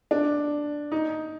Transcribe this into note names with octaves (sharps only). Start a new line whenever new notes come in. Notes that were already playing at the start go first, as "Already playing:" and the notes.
D4
D#4